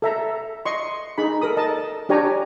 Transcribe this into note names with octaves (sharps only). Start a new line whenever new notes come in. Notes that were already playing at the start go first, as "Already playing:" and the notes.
A4 E5 A#5
D#5 C6 C#6
D#4 G#4 B5
A4 A#4 D#6
D#5 A5
D4 G4 C#5 G#5 A#5